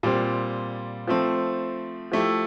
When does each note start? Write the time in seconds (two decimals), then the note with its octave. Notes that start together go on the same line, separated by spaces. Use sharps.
0.03 A#2 G3 C4
1.07 F3 A3 C4
2.12 F3 A3 E4 G4